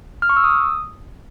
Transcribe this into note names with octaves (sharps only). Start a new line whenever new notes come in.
F6
C#6
E6
D#6